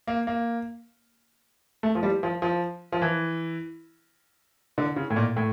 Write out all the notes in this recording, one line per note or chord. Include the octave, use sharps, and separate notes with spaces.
A#3
A#3
A3
F3
G3
F3
F3
F3
E3
D3
C#3
A2
A#2
A2